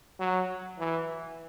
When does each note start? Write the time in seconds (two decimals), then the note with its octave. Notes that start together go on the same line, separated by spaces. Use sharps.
0.20 F#3
0.79 E3